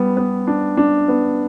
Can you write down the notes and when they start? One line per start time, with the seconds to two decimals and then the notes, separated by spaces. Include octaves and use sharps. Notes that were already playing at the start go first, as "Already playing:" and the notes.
Already playing: G3 B3
0.17 B3
0.47 D4
0.77 D4
1.08 B3